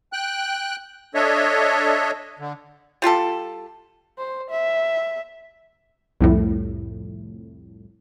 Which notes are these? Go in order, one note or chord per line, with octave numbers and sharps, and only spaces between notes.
G5 F#6
D4 A4 C#5 D#5 E5
D3
G3 F4 G4 A4
C5
E5
C2 F2 A2